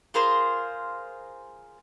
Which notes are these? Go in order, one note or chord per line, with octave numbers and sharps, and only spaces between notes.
F4 G#4 A#4 C5